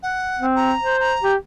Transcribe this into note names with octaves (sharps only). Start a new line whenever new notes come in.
F#5
C4
A#5
C5
A#5
G4